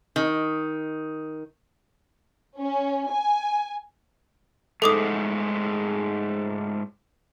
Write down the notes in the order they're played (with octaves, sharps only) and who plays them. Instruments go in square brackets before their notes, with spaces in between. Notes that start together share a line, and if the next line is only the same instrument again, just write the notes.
[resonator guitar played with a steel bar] D#3
[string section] C#4
G#5
[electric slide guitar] G#2 G#3 A3 [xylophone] A4 D6 D#6